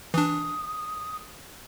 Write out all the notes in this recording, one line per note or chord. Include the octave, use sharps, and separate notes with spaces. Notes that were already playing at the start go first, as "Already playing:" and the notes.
E3 D4 D#6